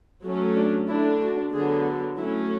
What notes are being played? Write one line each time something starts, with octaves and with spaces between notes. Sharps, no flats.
F#3 A3 C#4
D4
D3 A3 D4 E4
F#4
D3 F#3 B3 G#4
F#3 A3 C#4 E4